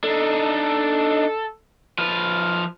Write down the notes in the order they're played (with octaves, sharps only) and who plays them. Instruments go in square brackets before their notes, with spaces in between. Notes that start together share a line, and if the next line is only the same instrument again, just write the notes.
[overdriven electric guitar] D4 D#4 [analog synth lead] A4
[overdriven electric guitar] F3 B4 [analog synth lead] F6